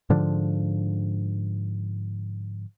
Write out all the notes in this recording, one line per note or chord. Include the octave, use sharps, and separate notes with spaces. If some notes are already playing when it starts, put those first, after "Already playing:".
G#2 D3 F3 D4